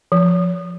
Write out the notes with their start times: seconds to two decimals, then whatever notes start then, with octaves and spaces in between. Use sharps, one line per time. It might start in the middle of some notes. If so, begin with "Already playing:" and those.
0.12 F3